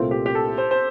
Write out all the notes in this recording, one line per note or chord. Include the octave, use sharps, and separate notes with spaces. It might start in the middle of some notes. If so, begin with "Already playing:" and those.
Already playing: C2 A#2 A3 C4 F4
G4
G4
A4
C5
C5